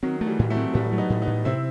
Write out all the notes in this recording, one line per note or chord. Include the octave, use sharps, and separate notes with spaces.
D#3 F#3 C4
A3
E3 G3
A2
F#3 A3
C4
A2 G3 B3
F#3
B3 D#4
A2
B3 D#4
A2
C3 C4 E4